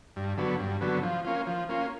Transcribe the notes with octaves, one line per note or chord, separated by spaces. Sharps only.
G2
D3 F#3 B3
G2
D3 F#3 B3
F3
A#3 C#4 F4
F3
A#3 C#4 F4